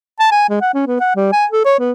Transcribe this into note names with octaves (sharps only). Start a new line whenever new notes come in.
A5
G#5
G#3
F#5
C#4
B3
F#5
G3
G#5
A4
C#5
B3